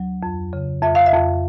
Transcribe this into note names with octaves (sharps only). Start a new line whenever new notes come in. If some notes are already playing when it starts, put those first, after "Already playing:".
Already playing: D2 F#3
F2
C#3
F2 E5
F5
E5
F2